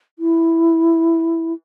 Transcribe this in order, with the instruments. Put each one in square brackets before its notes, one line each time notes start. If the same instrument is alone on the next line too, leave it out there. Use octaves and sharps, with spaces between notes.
[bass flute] E4